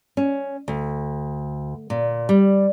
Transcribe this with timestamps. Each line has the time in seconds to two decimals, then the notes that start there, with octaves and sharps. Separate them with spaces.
0.17 C#4
0.68 D2
1.90 A#2
2.29 G3